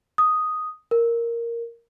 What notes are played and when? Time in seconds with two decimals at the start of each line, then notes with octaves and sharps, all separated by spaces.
0.18 D#6
0.91 A#4